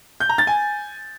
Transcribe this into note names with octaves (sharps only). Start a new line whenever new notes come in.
G6
A#5
A6
G#5